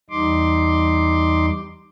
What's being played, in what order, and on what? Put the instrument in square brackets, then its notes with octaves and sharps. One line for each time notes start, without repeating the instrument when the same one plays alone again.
[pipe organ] E2 G3 D#4 C6 D6